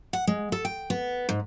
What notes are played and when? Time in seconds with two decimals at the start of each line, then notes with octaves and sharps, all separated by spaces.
0.13 F#5
0.27 G#3
0.52 A4
0.65 G5
0.90 B3
1.29 G#2